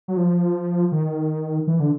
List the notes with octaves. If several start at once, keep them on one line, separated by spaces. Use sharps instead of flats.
F#3
F3
D#3
E3
D3